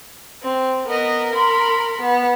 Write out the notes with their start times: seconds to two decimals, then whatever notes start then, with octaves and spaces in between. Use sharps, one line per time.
0.42 C4
0.87 B3 A#4 D#5
1.34 B5 C6
2.02 B3